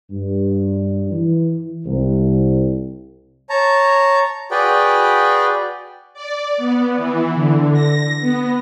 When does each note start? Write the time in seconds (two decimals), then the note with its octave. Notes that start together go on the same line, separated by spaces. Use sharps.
0.10 G2
1.11 E3
1.85 C2
3.50 C#5 A5 A#5
4.51 F#4 G#4 B4 D5 G5
6.14 D5
6.57 B3
6.97 E3
7.34 D3
7.73 A#6
8.21 B3